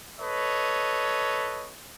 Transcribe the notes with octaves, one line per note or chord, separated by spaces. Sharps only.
A4 B4 C#5 D#5